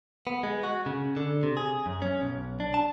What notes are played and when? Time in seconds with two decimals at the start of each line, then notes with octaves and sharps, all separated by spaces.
0.27 B3
0.43 G#3
0.63 F#4
0.86 C#3
1.17 D3
1.43 C3
1.57 G#4
1.86 F#2
2.02 C#4
2.22 B1
2.60 D4
2.74 A5